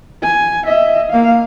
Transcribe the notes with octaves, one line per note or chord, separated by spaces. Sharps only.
G#5
D#5 E5
A#3 F5